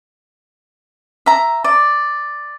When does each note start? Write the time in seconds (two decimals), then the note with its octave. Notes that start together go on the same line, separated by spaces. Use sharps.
1.26 E5 A#5
1.64 D5